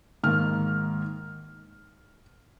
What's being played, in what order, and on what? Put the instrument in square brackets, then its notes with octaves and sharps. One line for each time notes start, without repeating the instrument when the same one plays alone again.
[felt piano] G#2 D#3 A#3 F6